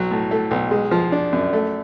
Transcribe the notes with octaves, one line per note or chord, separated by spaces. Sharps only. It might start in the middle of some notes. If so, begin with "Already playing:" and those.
Already playing: B1 F#3
A2
A3
B1
G#3
F3
D4
F#2
A3